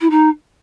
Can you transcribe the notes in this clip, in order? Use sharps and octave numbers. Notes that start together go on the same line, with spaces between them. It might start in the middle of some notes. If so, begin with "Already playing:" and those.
E4
D#4